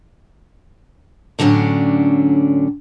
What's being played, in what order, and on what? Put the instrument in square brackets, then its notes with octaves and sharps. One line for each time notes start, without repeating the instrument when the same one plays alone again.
[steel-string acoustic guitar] A2 D3 F#3 G3 C#4 D4